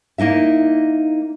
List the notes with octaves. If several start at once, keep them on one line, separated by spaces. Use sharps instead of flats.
A#3 D#4 E4 E5